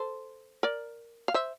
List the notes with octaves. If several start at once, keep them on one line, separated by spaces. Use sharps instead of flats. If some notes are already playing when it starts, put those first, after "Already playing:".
Already playing: A4 C5
A#4 D5
F5
C5 E5